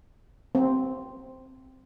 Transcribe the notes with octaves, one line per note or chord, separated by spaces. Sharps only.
C4